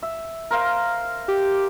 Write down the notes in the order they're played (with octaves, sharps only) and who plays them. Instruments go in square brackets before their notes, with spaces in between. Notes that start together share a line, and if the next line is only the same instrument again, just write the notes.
[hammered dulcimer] E5
A#4 C5 F5
[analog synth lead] G4